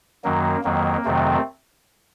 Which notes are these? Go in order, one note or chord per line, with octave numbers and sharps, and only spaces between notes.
F#2 D#3 F#3 A#3
F2 D#3 F#3 A#3
F2 C3 D#3 F#3 A3 C4